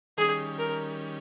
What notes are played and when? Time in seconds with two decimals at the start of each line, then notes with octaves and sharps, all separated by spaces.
0.17 D#3 G3 C#4 G#4
0.59 A#4